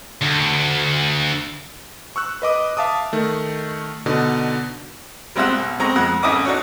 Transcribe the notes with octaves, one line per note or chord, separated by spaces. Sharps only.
D2
C#6 E6 F#6
B4 D#5 D6 D#6
E5 F5 A5 D6 D#6
D#3 A3
B2 D3 D#4
G3 G#3 C4 F4 E5 F#5
B1
G#3 C4 A#5 C#6
F2 G#3 F#5
G#1 C#4 E4 D#5 D6 D#6
D4 D#4 F#4 C#5